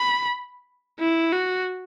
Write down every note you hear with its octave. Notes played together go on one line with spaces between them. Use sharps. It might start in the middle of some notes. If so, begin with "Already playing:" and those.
Already playing: B5
E4
F#4